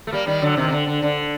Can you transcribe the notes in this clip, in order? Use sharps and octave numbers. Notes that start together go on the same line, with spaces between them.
A3
G3 A#3
D#3 G3
D3 F#3
C3 D#3
C3
D3
D3
D3